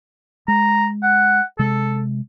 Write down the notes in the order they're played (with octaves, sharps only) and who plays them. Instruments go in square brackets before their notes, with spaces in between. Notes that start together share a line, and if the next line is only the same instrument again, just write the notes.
[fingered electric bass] G#3 [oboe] A#5
[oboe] F#5
[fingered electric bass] C3 G#3 [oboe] A4